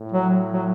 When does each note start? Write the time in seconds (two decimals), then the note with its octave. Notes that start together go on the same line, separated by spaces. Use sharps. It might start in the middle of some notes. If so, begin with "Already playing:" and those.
Already playing: A2
0.12 F#3
0.53 F#3